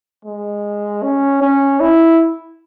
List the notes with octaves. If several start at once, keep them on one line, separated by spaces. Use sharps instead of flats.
G#3
C#4
C#4
E4